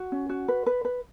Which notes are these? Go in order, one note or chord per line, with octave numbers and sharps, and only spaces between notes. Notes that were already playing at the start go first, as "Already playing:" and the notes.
Already playing: F#4
C#4
F#4
B4
B4
B4